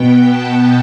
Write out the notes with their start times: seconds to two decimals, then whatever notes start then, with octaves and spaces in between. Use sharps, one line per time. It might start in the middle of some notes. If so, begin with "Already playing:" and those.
Already playing: B2 B3 G5
0.25 A5